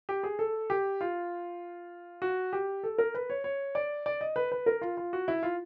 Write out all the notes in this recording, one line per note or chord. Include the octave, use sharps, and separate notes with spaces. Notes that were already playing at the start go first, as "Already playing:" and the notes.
G4
G#4
A4
G4
F4
F#4
G4
A4
A#4
B4
C#5
C#5
D5
D5
D#5
B4
B4
A#4
F4
F4
F#4
E4
F4